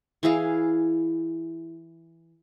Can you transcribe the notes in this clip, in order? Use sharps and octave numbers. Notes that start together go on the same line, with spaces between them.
E3 E4 G#4 F5